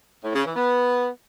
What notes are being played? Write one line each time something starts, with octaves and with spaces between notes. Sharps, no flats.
A2
C#3
E3
B3